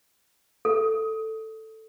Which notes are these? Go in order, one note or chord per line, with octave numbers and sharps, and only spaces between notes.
A4